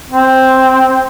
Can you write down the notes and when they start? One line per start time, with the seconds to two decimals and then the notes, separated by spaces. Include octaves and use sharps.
0.10 C4